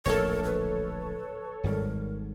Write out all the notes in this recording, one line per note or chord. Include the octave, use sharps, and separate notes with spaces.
D1 A#1 D3 A4 A#4 C#5
B4
G#1 G#2 G3 A#4